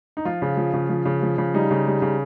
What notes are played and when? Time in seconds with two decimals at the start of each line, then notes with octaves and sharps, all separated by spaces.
0.17 D#4
0.25 F3 F4
0.42 C#3
0.57 F3
0.73 C#3
0.89 F3
1.05 C#3
1.23 F3
1.38 C#3
1.54 G3 D#4
1.71 C#3
1.87 G3
2.02 C#3